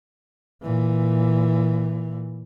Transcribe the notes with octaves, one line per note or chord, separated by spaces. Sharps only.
A#2 E3